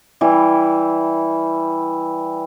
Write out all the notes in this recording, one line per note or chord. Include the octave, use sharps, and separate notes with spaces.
E3 G3 E4